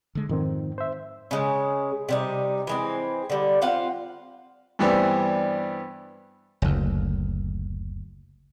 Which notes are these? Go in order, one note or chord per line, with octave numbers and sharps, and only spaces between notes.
D3 G#3
F2 G#2 D#3 C4
C5 E5
C#3 G#3
C3 G3 D#4
E3 G#3 C4
D3 G3
C4 F4 F5 F#5
G2 E3 G3 B3 C4 D4
F#1 D2